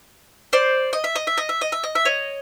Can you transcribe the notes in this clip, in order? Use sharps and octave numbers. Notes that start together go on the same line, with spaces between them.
C5 D5
D#5
E5
D#5
E5
D#5
E5
D#5
E5
D#5
E5
C#5 D#5